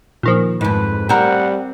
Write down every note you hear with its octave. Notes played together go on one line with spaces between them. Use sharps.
A#2 D#3 F3
F2 G#2 B4
G3 C4 A#4 F#5